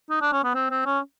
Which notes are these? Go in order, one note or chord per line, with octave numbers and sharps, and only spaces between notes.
D#4
D4
C#4
B3
C4
C4
C#4